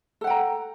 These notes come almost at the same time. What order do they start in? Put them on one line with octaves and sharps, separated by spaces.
A4 F#5 G5 A#5